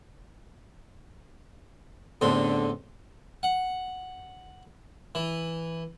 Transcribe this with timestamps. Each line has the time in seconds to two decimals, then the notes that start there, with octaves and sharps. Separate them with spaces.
2.21 A1 E2 D3 C4
3.43 F#5
5.15 E3